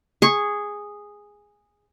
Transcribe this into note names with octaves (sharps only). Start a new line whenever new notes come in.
G#4 C#6